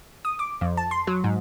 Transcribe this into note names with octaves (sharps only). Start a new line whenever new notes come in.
D#6
D6
F2
A5
C6
F#3
G#2